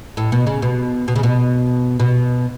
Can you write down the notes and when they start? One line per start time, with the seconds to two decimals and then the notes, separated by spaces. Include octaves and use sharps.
0.17 A2
0.32 B2
0.47 C#3
0.62 B2
1.08 B2
1.16 C#3
1.23 B2
2.00 B2